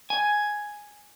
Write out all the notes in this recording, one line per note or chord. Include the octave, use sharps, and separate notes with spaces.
G#5